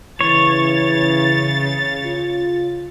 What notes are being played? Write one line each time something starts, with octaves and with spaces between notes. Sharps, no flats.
C#3 E3 C#5 A6
F4